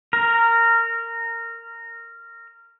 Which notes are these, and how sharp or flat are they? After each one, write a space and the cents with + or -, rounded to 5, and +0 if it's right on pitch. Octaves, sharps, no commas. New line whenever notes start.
A#4 -15